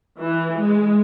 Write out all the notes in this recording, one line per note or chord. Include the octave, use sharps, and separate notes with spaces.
E3
G#3